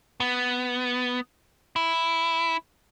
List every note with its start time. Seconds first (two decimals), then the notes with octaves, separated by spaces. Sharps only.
0.20 B3
1.76 E4